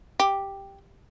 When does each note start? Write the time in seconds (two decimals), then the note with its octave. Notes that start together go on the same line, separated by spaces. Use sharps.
0.20 G4